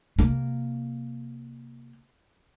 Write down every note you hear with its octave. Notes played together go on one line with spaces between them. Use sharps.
C3 A#3